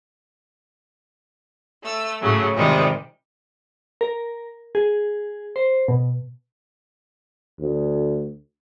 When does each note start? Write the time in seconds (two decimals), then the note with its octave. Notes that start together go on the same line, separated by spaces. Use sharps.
1.83 A3 E6
2.20 A2 C#3 F#3 A3
2.54 C3 D#3 F3 G3 G#3
4.01 A#4
4.75 G#4
5.56 C5
5.88 B2
7.59 D2